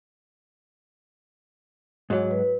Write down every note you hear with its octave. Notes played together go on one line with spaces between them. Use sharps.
G#2 F#3 F#4 C#5
B4